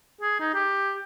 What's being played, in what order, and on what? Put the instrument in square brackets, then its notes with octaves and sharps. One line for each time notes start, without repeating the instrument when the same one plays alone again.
[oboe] G#4
D#4
G4